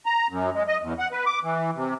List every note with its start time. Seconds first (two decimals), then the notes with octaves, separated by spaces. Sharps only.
0.06 A#5
0.30 F#2
0.55 G#3
0.68 D#5
0.82 E2
0.99 F#5
1.12 B4
1.26 D6
1.43 E3
1.76 C3